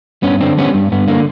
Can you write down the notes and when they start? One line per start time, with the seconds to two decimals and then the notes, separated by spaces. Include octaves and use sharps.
0.23 G2 B3 C#4
0.40 D3 C4 D4
0.57 G3 B3 C#4
0.74 G2
0.92 G2 B3
1.08 D3 A#3